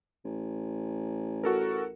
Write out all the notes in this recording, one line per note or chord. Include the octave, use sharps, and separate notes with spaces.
A1
F#4 A4 A#4